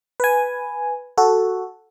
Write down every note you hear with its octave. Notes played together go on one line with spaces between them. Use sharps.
B4 G#5
F#4 A4